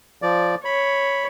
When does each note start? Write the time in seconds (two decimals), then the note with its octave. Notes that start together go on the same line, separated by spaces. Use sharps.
0.22 F3 D5
0.65 C#5 B5